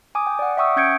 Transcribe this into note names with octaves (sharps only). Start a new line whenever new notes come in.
G#5 D6 D#6
G5
D5 F#5
E5 F#5 G5 C#6 D#6 E6
C#4 G6 G#6 C#7 D7